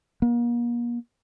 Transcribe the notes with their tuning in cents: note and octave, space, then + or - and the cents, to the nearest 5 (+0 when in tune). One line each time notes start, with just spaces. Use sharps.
A#3 +40